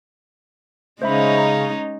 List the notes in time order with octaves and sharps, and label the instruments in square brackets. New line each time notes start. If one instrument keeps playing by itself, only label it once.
[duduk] C#3 [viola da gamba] G#3 C#4 D#4 [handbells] C5 E5 B5
[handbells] A#5